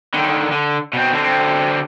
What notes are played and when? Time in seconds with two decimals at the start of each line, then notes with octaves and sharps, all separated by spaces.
0.14 D3 D#3
0.51 D3
0.93 B2 C4
1.13 D3 C4